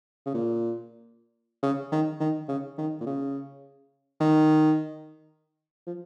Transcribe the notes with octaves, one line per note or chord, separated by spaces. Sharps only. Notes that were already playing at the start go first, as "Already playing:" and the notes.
C#3
A#2
C#3
D#3
D#3
C#3
D#3
A#2
C#3
D#3
F3